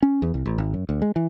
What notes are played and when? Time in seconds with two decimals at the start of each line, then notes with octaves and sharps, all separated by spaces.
0.03 C#4
0.22 E2
0.34 C2
0.46 A1
0.58 G#1
0.74 F#2
0.89 D2
1.02 G#3
1.16 E3